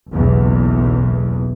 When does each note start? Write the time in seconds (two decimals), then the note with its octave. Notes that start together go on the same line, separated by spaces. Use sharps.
0.12 F#1 B1 E2